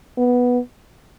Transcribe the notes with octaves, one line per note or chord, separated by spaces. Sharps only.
B3